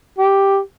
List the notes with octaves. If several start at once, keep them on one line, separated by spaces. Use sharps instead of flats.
G4